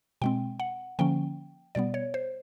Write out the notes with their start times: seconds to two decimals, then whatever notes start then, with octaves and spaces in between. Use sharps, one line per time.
0.22 B2 G#3 C4 G5
0.60 F#5
0.99 D3 F3 A#3 C#4 G5
1.75 B2 G3 B3 D5
1.94 C#5
2.14 C5